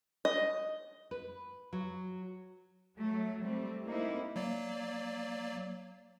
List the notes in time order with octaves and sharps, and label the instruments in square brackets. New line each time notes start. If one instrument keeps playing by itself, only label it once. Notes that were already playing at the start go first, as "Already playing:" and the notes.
[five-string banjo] D#5
[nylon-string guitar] B4
F#3
[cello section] F#3 A3
G3 A3 C4
A#3 C4 D#4 E4
[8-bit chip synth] F#3 A#3 D5